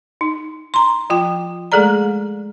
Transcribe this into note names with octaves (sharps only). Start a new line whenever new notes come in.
D#4
A#5 C6
F3 F4 G5
G#3 A3 G#4 A4 D5 A#5